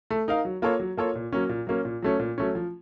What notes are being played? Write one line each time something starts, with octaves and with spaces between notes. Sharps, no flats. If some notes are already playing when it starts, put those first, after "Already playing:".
A3
D#4 A#4 F5
F#3
A#3 F4 A4 C#5
F#3
A#3 F4 A4 C#5
A#2
F#3 A#3 C#4
A#2
F#3 A#3 C#4
A#2
F#3 A3 C#4
A#2
F#3 A3 C#4
F3